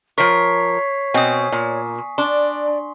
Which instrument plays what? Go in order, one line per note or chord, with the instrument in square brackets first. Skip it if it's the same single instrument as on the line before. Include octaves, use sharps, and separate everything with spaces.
[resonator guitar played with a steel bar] F3 A#4 [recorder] C#5 [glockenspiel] C#6 B6 C7
[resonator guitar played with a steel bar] B2 C4 [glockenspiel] G#5 D#6
[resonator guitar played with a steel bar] A#2
[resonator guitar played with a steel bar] D4 [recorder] D5 [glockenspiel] C6